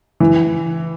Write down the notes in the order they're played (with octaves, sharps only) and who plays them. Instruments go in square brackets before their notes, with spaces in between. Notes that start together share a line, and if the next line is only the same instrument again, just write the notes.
[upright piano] E3